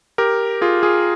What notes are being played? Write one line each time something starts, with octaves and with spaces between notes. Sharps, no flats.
G4 A#4
F4 G#4
F4 G#4